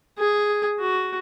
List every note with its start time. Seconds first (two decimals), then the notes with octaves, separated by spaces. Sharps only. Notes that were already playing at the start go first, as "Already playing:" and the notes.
0.18 G#4
0.80 F#4